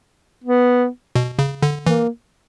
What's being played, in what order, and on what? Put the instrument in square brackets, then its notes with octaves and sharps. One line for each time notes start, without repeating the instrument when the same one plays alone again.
[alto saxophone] B3
[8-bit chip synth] B2
C#3
D3
[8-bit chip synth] E3 [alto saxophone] A#3